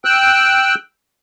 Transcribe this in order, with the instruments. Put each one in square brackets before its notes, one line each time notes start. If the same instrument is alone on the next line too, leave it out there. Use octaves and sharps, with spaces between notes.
[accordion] G5 E6 F#6